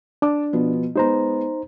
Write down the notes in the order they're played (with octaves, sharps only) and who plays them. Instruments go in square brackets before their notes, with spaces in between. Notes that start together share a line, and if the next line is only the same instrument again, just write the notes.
[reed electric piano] D4 [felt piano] A5 D6
[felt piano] B2 F3 B3
[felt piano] G#3 B3 [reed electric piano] D#4 C5 A#5